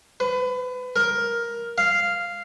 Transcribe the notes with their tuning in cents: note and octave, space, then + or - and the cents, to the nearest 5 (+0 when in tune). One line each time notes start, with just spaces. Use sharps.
B4 +30
A#4 +10
F5 -5